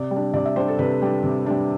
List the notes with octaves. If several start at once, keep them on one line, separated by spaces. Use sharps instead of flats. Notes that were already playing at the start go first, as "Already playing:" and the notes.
Already playing: C3 D5
G3
D4
C3 D5
E5
G3 D4 C5
A4
C3 B4
G3 D4
C3
G3 D4